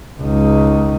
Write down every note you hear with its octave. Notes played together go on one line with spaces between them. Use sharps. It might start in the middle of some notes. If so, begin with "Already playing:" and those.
C#2 D#4